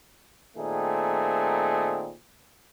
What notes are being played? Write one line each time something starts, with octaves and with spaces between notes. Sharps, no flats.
A#2 D#3 A3 C4 G#4